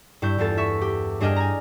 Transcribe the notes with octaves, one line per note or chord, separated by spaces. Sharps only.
G2 E4 C#6 G6
E2 G2 F4 A4 A6
E5 C#6
G4
G2 D4 G#4 D#5 G5 F6
G#5 A#5